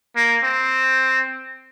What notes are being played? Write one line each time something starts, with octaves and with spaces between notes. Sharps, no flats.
A#3
C4